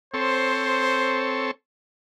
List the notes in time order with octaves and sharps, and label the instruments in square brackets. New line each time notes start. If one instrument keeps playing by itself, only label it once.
[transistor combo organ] C4 A4 C#5 [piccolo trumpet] C5